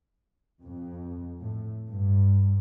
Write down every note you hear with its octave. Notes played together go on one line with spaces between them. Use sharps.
F2
A2
G2